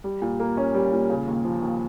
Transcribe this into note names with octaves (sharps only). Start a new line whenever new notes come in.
G3
A#2
A#3
C#4
G3
A#2
C#3
D#2
F3
D#2